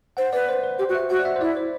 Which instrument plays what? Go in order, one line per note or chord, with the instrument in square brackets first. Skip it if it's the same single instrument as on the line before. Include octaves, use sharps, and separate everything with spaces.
[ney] C5 [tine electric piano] F#5
[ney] B4 [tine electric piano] D5
[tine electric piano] C5
B4
[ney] G4 [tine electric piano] C5
[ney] F#4
[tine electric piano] E5
[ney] F#4 [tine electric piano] F#5
[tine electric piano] D5
E5
C5
[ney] E4 [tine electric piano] D5
[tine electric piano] C5